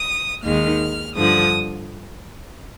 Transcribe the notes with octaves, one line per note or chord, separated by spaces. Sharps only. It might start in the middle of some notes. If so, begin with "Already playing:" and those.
Already playing: D#6
D#2 D#3 G#3 D#4 F6
G2 D3 F3 D#6